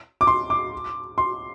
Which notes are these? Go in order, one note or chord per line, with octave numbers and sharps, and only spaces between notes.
D6
C6
D6
C6